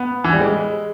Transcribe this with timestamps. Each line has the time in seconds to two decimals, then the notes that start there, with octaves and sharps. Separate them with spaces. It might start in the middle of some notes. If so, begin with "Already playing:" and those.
Already playing: B3
0.24 E3
0.33 G3
0.41 G#3